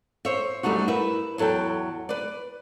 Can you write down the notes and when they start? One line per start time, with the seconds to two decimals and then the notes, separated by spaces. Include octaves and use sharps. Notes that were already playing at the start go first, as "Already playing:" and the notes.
0.25 C5 C#5 E5
0.63 F#2 G3 A3 D#4 F#4
0.88 E4 A#4 B4 E5
1.38 E2 F#3 A4 E5 G5
2.09 B4 D5